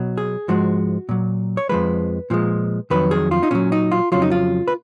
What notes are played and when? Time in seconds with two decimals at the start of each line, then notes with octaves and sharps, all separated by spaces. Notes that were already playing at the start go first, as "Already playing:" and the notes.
Already playing: B2 F#3
0.18 G#4
0.48 G#2 F3 G#3 F#4
1.09 A#2 F#3
1.57 C#5
1.69 F2 F3 G#3 B4
2.30 A#2 F3 G#3
2.90 F2 D#3 F#3 B4
3.11 G#4
3.31 F4
3.43 D#4
3.51 A#2 F#3 C#4
3.72 D#4
3.91 F4
4.12 F2 C#3 F#3 F4
4.22 D#4
4.31 F4
4.68 B4